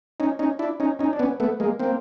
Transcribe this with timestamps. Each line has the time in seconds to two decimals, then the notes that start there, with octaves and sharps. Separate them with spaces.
0.20 C#4 D#4
0.39 C#4 D#4
0.59 D4 E4
0.80 C#4 D#4
0.99 C#4 D#4
1.13 D4
1.19 B3 C#4
1.40 A3 B3
1.60 G#3 A#3
1.79 A#3 C4